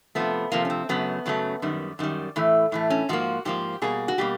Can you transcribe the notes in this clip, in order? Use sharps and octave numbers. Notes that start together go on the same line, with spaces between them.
C3 F3 A3 B3
C3 F3 A3 A#3
C#4
C4
F#2 C#3 F#3 A3 B3
F#2 C#3 F#3 A3
F#2 D#3 G3
F#2 D#3 G3
A2 E3 A3
A2 E3 A3
C#4
G#2 F3 A#3 F#4
G#2 F3 A#3 G4
B2 G3 A#3 G#4
F#4
B2 G3 A#3 G4